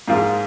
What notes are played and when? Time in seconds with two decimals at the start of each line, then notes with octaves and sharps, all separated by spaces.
0.08 G#2 F3 A#3 F4 G#4